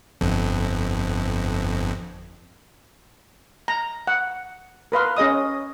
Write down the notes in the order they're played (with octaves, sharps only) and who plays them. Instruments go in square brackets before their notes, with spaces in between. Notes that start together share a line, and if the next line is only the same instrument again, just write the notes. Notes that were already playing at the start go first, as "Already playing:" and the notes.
[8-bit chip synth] G1 F2
[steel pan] A#5
F#5
A#4 B4 F5 C6
C#4 G#4 D#5 D#6